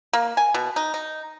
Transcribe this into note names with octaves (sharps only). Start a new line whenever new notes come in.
A#3
G#5
B2
D#4
D#4